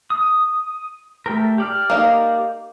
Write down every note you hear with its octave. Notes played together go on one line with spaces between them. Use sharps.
D#6
A3 G4 A#4
G4 D5 F6
A#3 D#4